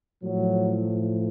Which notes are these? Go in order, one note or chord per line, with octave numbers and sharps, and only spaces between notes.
A2 F3 F#3